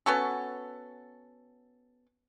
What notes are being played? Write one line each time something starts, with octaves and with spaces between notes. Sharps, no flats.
B3 C#4 F#4 A4